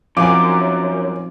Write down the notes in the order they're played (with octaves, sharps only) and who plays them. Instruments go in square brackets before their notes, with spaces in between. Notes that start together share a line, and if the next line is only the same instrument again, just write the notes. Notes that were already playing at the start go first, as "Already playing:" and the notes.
[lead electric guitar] F#2 [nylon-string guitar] F3 C4 D#4 [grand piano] F5 G#5 [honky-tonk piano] D6